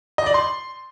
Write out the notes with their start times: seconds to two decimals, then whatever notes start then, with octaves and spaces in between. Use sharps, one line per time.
0.18 D#5
0.26 D5
0.34 C6